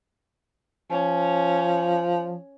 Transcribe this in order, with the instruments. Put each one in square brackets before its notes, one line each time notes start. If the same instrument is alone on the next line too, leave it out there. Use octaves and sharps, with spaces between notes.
[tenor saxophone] F3 [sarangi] C#4